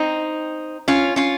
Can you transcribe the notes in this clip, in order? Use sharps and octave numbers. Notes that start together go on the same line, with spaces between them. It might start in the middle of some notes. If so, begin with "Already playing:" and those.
Already playing: C4 D#4
C#4 F4
C#4 F4